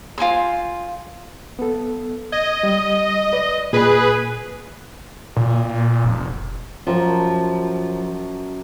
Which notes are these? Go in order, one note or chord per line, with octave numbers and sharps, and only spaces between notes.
F4 C5 G#5 C6
B3 A4
D#5 G#6
G3
B4 D5
A#2 G#4 B4 G#5
A#2
F1
F#2 F3 A5 A#5